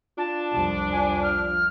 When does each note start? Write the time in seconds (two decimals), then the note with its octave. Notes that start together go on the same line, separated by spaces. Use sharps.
0.18 D4 F4 A5
0.52 C2 F2
0.92 F3 G#5
1.22 F6